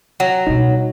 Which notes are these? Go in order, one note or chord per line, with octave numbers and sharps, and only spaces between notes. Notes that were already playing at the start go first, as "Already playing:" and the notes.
F#3
B2 G3 D#4